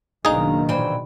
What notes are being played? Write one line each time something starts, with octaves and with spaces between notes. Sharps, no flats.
F#1 B2 D#3 D4 D#4 G#4 F5 A#5
A#2 E3 C5 D5 G5 B5